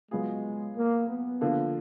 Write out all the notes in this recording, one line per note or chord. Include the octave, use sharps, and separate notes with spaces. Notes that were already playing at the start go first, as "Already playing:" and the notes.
F#3 G#3 B3 F4 G#4
A#3
B3
D3 F3 A#3 D4 F4